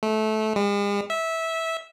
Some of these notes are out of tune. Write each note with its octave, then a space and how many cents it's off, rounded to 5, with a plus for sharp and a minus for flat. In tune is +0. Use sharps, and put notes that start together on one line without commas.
A3 -20
G#3 -45
E5 -15